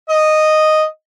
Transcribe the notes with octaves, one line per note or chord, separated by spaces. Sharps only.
D#5